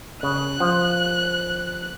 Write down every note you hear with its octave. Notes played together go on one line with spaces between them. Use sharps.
C#3 F#6
F3